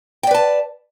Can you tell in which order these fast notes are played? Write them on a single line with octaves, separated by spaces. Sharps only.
G5 D5 B4 A5